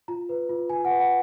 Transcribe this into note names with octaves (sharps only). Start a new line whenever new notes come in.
F4 A#5
B4
F4
F4 G#5
F#5
B4
F#5